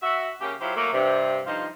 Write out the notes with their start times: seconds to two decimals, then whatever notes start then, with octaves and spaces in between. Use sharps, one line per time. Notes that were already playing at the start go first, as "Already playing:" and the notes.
0.03 F#4 E5
0.41 C#3 A#3 C#4 G4
0.61 F#3 E4 F4 G4 C5
0.76 F#3 A3 A#3
0.93 G2 C3
1.46 G2 F3 D#4 F4 C5